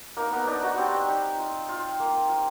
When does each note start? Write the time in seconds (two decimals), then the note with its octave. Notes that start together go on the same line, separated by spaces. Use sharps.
0.17 A#3 D#4 A#4
0.32 B3 B4
0.47 D4 D#4 D5
0.63 F#4 F#5
0.78 C4 G4 G5
1.08 D#4
1.39 F4
1.69 F4
2.00 A#3
2.29 F4